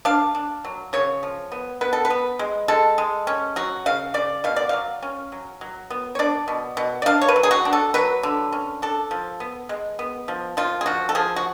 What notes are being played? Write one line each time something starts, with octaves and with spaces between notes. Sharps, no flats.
D4 F5
D4
F#3
C#3 C#5
F3
B3
B3 B4
A4
B4
B3
G#3
G#3 A4
G#3
C#4
F#3 F#4
C#3 F5
C#3 D5
B2 F5
D5
F#3 F5
C#4
F#3
F#3
B3
C#5
D4 D5
B2
B2
D5
D4 F5
C#5
B4
F#3
G#4
F#4
D4
A4
F#3 B4
D3
C#4
D4 A4
F3
B3
G#3
B3
F3
F3 F4
G#4
F3 F#4
A4
F3 G#4
F#4